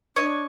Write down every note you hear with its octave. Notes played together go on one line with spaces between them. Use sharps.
D4 C#5 D#5